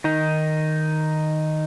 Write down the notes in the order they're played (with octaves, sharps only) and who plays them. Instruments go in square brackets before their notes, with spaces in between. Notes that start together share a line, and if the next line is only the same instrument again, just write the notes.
[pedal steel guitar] D#3 D#4